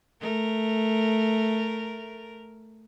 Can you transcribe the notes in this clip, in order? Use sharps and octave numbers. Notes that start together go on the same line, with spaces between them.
A3 A#4